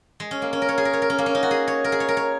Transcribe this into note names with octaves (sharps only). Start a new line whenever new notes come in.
G#3
C#4
A#3
C#4
A#4
C#5
G#4
A#4
C#5
A#4
C#4
A#3
C#4
D#4
F#4
G#4
C#5
A#4
G#4
C#5
A#4
C#5